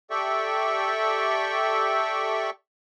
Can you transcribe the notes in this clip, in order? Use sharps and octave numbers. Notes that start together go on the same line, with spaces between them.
G4 A4 D5 E5 G5 C#6